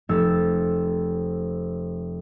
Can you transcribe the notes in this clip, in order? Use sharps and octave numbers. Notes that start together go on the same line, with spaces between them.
F1 E6 A6